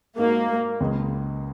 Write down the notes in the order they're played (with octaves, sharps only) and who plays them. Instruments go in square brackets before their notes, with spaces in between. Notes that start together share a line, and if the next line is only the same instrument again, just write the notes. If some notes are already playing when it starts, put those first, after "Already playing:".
[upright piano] G#2 G#3 D#4 F#4 [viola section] A#3
[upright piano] C#2 C#3 G#3